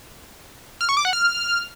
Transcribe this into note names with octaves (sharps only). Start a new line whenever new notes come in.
F6
C#6
D6
F#5
F6